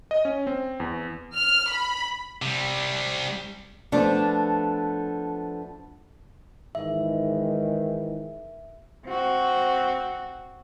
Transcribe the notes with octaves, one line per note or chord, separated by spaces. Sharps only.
D#5
C#4
C4
E2
F6
B5
C3 G3
F3 A3 B3 D4 A4
G#2 D#3 E3 E5
C4 F#4